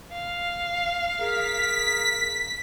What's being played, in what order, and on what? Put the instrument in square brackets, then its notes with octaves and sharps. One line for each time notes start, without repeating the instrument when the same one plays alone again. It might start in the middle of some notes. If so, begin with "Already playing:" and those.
[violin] F5
[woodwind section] G#4 A#4 [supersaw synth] B6